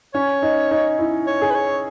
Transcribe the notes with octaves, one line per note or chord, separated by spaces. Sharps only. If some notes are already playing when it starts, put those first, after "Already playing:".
C#4 C#5
D#4
D#4
E4
C#5
G#4
B4
C#5